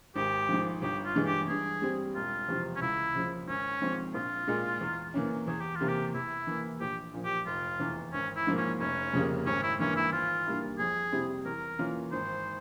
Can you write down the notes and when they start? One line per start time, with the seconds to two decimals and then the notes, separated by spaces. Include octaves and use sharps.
0.16 G#1 G4
0.49 G#2 F3
0.82 G1 G4
1.05 F4
1.15 G2 E3 G#3
1.26 G4
1.48 G2 G#4
1.82 G3 C4
2.15 E1 F4
2.48 E2 C3 F3
2.76 C#4
2.81 C#2 E4
3.14 C#3 F3 G#3
3.47 G#1 C#4
3.82 G#2 F3 C4
4.14 A#1 F4
4.48 A#2 G#3
4.81 E2
5.14 E3 A#3 C#4
5.48 E2 G#4
5.61 G4
5.76 F4
5.81 C3 E3 A#3
5.88 G4
6.14 E2 E4
6.47 E3 A#3
6.80 A#1 G4
7.14 A#2 F3
7.25 G4
7.46 F1 F4
7.80 E2 E3
8.13 G#1 C#4
8.36 E4
8.47 G#2 F3 A#3
8.57 C#4
8.80 F1 C#4
9.13 F2 C#3 G3 A#3
9.46 G#1 C#4
9.63 E4
9.79 G2 E3 A#3 C#4 E4
9.96 E4
10.13 G#1 F4
10.46 G2 G3 A#3 E4
10.79 F2 G#4
11.12 C3 G3 C4 E4
11.46 E2 A#4
11.79 E3 A#3 C#4 F4
12.12 G#1 C5